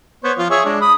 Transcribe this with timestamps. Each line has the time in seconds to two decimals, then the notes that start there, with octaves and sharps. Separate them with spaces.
0.24 B3 C5 C#5
0.38 F3 F4
0.50 G#4 C#5 E5
0.65 G#3 D4
0.81 B5 D#6